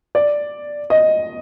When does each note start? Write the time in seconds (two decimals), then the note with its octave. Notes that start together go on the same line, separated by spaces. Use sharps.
0.15 D5
0.90 D#5